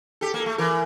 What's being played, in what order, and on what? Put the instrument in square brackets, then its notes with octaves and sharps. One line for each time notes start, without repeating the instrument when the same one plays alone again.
[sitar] G4 [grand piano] A4
[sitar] A#3
[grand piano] A4
[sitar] A3
[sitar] E3 [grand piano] A#4